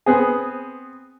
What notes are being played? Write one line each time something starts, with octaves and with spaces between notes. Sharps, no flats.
B3 C4 G#4